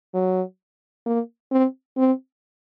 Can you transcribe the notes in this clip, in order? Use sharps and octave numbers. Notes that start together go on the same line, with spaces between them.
F#3
A#3
C4
C4